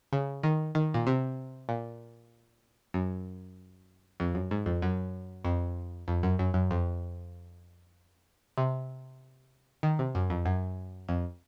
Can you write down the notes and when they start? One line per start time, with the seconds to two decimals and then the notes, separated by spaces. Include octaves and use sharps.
0.13 C#3
0.43 D#3
0.75 D#3
0.94 A#2
1.07 C3
1.69 A#2
2.94 F#2
4.20 F2
4.35 F#2
4.51 G#2
4.66 F2
4.82 F#2
5.45 F2
6.08 F2
6.23 F#2
6.39 F#2
6.54 F#2
6.71 F2
8.58 C3
9.83 D#3
9.99 C3
10.15 F#2
10.30 F2
10.46 F#2
11.08 F2